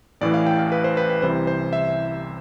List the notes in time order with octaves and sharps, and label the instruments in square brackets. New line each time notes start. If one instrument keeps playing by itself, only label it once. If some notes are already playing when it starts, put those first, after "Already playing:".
[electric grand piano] A1 A2 E3 D5
F5
G5
F5
B4
C5
B4
B4
C2 C3 E3 C5
C5
E5